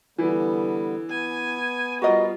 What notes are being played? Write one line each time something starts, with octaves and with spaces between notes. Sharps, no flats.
D3 E3 G3 B3
B3 G#5
G3 F4 F#4 A#4 D#5